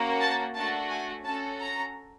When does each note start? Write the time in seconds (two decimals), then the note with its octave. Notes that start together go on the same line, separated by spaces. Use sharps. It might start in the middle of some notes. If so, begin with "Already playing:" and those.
Already playing: A#3 C#4 F#4
0.21 A5
0.55 A3 D4 F#4 A5
0.89 G#5
1.24 C#4 F#4 A4 A5
1.59 A#5